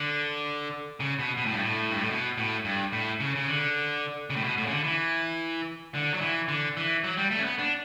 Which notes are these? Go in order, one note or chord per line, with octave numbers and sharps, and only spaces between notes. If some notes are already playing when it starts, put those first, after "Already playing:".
Already playing: D3
C#3
B2
B2
A2
G2
A2
G2
A2
B2
A2
G2
A2
C#3
C#3
D3
C#3
A2
B2
A2
C#3
D3
E3
D3
F#3
E3
D3
E3
F#3
G3
A3
C#4
B3
D4